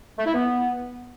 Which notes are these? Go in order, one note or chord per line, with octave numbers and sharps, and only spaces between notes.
A3
E4
B3